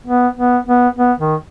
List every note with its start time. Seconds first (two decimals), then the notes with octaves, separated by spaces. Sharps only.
0.07 B3
0.37 B3
0.67 B3
0.97 B3
1.20 D#3